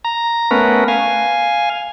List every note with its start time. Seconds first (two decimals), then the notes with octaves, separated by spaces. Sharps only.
0.05 A#5
0.51 A3 B3 C#4 A#4 B4
0.88 F5 G#5